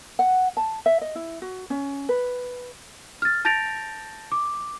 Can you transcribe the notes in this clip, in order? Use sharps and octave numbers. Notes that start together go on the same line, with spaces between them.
F#5
A5
E5
D#5
E4
F#4
C#4
B4
F6 A6
A5 G6 A6 A#6 D7 F7
D6